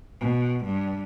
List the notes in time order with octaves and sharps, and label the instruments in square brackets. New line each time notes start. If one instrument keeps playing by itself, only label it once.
[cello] B2
G2